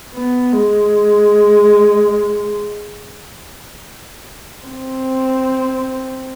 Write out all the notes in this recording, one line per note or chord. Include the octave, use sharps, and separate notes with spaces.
B3
G#3
C4